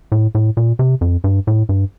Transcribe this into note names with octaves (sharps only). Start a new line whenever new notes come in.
A2
A2
A#2
C3
F2
G2
A2
G2